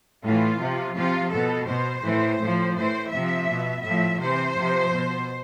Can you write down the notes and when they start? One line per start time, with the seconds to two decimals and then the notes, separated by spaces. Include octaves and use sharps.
0.24 A2 E3 F4
0.60 C3 F3
0.96 C3 F3 F4
1.32 B2 A4
1.68 B2 C5
2.04 A2 E3
2.40 A2 F3
2.76 A2 E3 C5
3.12 C3 F3 E5
3.49 B2
3.84 A2 F3 E5
4.20 C3 E3 C5
4.56 C3 F3
4.92 B2